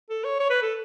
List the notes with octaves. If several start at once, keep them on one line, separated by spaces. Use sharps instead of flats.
A4
C#5
C#5
B4
A4